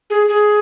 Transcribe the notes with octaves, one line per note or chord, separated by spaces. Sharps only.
G#4
G#4